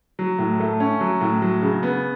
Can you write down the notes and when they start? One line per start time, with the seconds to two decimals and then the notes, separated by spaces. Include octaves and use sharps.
0.19 F#3
0.39 A2
0.60 A3
0.80 C#4
1.01 F#3
1.21 A2
1.42 F#3
1.62 C#3
1.83 B3